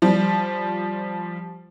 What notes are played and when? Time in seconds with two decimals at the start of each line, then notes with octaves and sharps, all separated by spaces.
0.02 F3 G3